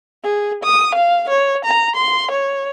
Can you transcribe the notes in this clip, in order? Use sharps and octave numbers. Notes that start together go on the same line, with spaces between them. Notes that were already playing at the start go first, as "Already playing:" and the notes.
G#4
D#6
F5
C#5
A#5
C6
C#5